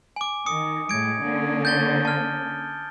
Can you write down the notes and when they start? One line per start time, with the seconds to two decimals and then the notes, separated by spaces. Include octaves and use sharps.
0.16 G#5 D6
0.46 D#3 D#6 C#7
0.89 A2 G#3 G#6 D7
1.23 D3 A#3 C#4
1.65 G6 A6 G7
2.05 A5 F6